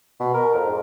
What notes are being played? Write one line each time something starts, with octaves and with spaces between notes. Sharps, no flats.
B2
A#4
F2
G#2